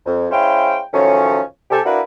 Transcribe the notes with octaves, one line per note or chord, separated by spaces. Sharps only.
F2
G#3 C#4 E4 C5 F5 G5
A2 D#3 F3 F#3 A3 C#4
C3 G4 A4 G#5
A#3 D4 E4 F#4 A#4 B4